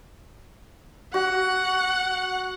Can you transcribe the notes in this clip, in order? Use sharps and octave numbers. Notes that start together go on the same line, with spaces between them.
F#4 F#5